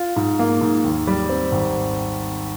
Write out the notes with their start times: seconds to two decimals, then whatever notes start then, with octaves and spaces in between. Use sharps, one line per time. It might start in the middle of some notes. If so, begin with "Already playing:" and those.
Already playing: F4
0.16 G#2
0.39 A#3
0.61 G#2
0.84 D#2
1.07 G3
1.29 C4
1.52 G#1